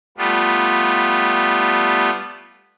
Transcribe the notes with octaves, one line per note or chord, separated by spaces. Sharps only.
G3 A3 B3 F4